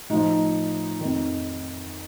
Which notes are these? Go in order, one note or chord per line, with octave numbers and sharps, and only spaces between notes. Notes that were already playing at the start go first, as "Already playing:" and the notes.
A2 F3 D#4
F2 D#3